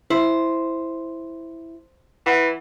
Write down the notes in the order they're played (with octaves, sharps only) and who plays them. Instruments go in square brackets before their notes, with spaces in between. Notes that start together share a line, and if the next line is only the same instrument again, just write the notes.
[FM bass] E4 [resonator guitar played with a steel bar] C5
[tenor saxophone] E3 [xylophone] F#5